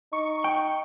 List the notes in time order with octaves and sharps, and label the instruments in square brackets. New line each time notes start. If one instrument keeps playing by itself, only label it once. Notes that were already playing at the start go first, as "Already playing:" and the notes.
[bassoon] D#4 [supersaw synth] C#6
[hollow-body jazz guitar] G5